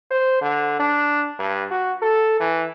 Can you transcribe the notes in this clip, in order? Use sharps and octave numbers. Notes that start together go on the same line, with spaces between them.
C5
D3
D4
G2
F#4
A4
E3